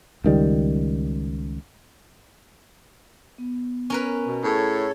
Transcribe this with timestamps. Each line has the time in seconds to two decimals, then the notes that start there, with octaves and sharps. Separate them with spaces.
0.24 C#2 D#3 G3
3.38 B3
3.90 C#4 A#4 B4
4.26 B2
4.44 A2 G#4 A4 C#5